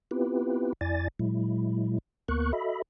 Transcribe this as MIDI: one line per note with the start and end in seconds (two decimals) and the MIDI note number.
0.11 0.73 59
0.11 0.73 60
0.11 0.73 64
0.11 0.73 65
0.11 0.73 67
0.11 0.73 71
0.81 1.08 41
0.81 1.08 64
0.81 1.08 74
0.81 1.08 80
0.81 1.08 93
1.19 1.98 46
1.19 1.98 54
1.19 1.98 56
1.19 1.98 64
2.28 2.52 38
2.28 2.52 58
2.28 2.52 59
2.28 2.52 70
2.28 2.52 85
2.28 2.52 90
2.53 2.82 66
2.53 2.82 69
2.53 2.82 75
2.53 2.82 76
2.53 2.82 83